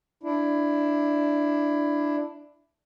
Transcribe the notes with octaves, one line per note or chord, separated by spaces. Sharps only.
D4 E4